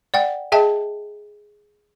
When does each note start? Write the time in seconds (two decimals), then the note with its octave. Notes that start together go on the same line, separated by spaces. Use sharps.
0.14 D5 F#5 G5
0.52 G#4 D#5 E5 G5 A5